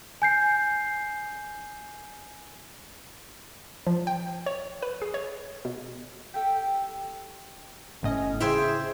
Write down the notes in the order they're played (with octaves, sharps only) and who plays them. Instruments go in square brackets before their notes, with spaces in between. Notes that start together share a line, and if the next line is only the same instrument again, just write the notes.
[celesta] G#5 G6 C7
[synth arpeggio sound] F3
G5
C#5
B4
G#4
C#5
B2
[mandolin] G4 A4 G5
[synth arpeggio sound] G1 A2 D#5 [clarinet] C#4
[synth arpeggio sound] C#3 E4 [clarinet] G#4 [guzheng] C5 E5 G5